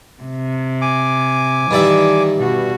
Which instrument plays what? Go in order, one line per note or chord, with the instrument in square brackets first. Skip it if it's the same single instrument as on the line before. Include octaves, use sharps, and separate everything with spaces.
[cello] C3
[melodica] G#5 D6
[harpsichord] G2 D5 E5 [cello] D#3 E3
[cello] B2 F#4